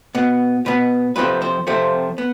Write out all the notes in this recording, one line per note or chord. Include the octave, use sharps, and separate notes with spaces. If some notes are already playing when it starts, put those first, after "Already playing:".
B2 B3
B2 B3 B4
F2 C3 F3 A3 C4 B4
C5
F2 C3 F3 A3 C4
B3